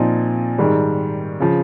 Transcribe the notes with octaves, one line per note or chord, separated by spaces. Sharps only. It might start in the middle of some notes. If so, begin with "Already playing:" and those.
Already playing: A#2 F3 C4 D#4
G#2 D#3 G3
C#3 F3